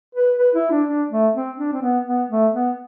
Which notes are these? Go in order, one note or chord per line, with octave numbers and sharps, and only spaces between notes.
B4
B4
E4
D4
D4
A3
C4
D4
C4
B3
B3
A3
B3